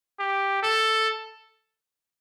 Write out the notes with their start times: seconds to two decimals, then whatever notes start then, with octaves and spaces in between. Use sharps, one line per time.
0.19 G4
0.63 A4